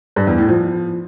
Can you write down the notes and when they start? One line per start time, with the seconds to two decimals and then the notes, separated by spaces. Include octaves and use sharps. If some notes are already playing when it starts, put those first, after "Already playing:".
0.16 G2
0.27 E2
0.38 A2
0.49 F3